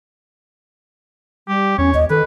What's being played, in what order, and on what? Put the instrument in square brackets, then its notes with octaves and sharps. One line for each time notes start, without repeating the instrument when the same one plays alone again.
[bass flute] G3 [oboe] G4
[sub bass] E2 [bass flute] C#4 [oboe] C#5
[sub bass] D#2 [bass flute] D#5
[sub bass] D#3 [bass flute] A4 [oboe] B4